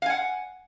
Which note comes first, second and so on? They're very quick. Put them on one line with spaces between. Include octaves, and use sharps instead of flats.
F5 G#5 F#5